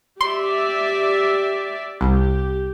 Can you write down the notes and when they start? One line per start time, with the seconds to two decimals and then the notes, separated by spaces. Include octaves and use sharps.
0.21 G4 D5 E5 C6
2.01 C2 G4